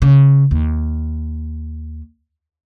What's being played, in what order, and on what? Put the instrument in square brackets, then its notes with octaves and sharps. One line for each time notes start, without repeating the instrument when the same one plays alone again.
[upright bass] C#3
D#2